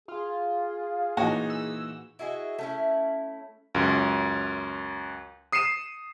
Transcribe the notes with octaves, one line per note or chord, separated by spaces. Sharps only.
F4 G#4
A#2 E3 D#4 F#4 C#5
E6
E4 F#4 G#4 D#5
A3 C#4 E4
C#2 F#2
D#6 C7 C#7 D#7 E7